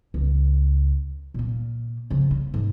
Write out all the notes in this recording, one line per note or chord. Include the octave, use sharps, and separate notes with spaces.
C#2
A#2 A#3
C#3 F3
A#3
G#2